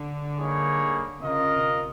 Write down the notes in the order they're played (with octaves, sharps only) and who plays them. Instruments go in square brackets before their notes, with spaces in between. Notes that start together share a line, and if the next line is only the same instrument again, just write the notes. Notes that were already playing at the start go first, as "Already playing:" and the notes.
Already playing: [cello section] D3
[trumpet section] G3 A#3 D#4 G#4 C#5
[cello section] C#3 [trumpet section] F4 A#4 D#5
[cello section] C3